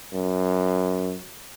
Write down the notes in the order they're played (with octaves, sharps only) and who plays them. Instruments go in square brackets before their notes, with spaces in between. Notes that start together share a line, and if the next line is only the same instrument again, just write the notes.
[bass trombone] F#2